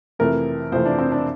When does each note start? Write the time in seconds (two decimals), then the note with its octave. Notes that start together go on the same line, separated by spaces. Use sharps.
0.19 F2 C3 E3 A3 A#4
0.72 F2 C3 E3 A3 C5
0.85 D4
0.98 C4
1.12 D4